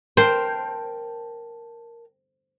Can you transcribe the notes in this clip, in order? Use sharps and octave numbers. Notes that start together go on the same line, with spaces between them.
A#4 C5 G5 A5